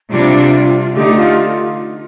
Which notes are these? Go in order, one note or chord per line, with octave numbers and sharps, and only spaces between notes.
C3 G3 D4 F4
D3 A3 D#4 G4
F4